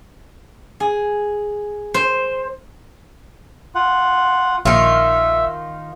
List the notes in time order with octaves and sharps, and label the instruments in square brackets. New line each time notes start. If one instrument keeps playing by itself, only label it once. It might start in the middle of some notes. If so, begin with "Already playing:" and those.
[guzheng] G#4
C5
[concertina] F4 F#5
[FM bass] A#1 [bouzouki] D#3 F4 [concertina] E5